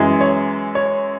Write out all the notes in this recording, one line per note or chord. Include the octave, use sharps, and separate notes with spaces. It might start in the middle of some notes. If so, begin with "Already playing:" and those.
Already playing: F#2 E3 G#3
C#5
C#5